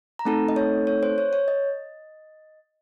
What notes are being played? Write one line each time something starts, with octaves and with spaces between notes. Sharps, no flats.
A#5
A3 C4 D#4 A4 A5
D#5
C#5
C#5
C5
C#5
C#5
D#5